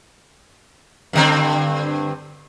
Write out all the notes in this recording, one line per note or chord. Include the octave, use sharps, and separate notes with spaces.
G2 D3 C4